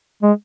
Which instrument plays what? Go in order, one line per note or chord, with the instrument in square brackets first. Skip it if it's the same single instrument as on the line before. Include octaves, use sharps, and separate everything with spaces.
[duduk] G#3